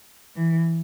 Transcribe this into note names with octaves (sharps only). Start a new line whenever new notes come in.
E3